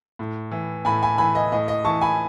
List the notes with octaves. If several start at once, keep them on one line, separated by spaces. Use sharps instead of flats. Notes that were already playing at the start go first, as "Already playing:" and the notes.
A2
E3
A2 G#5 B5
G#5 B5
E3 G#5 B5
D#5
A2 D#5
D#5
E3 A5 C#6
G#5 B5